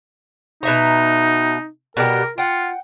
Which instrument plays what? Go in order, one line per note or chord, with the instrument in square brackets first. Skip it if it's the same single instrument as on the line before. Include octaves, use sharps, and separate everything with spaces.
[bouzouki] B2 E5 A#5 [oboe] D#4
[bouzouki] B2 G3 G4 [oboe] A#4
[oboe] F4 [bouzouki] F#5 G5